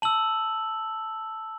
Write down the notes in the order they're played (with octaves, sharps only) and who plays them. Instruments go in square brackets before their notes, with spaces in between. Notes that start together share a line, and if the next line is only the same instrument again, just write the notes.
[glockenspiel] A5 E6 F#7